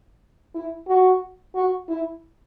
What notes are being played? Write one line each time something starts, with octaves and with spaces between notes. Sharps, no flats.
E4
F#4
F#4
E4